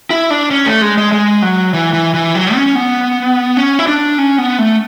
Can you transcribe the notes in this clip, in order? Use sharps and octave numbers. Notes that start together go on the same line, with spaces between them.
E4
D4
C#4
A3
G#3
G#3
G#3
F#3
E3
E3
E3
F#3
C#4
B3
C#4
E4
D4
C#4
B3
A3